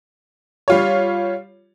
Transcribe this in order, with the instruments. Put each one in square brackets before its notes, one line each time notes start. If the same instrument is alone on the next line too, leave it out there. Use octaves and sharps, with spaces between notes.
[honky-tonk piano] G3 F4 C#5